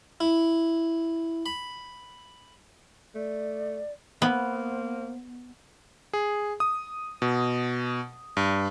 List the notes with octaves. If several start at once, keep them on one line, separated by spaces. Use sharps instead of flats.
E4
B5
A3 D5
A#3 B3 C5
G#4
D#6
B2
G2